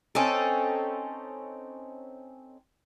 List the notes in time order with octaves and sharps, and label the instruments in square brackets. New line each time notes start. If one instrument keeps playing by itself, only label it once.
[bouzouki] C4 C#4 D#4 A4